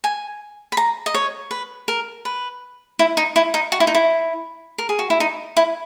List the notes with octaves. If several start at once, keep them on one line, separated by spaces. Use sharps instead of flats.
G#5
B5
A#5
D#5
C#5
B4
A#4
B4
E4
D#4
E4
D#4
F#4
E4
D#4
E4
A#4
G#4
F#4
E4
D#4
E4